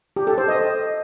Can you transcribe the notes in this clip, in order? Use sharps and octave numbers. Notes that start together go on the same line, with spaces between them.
G4
A4
C5
D#5